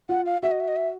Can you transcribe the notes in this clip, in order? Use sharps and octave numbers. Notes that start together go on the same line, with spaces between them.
F4 F#5
F5
F#4 E5
D#5
E5
D#5
E5